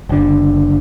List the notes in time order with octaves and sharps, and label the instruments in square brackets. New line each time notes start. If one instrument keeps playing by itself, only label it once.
[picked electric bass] F#1 D3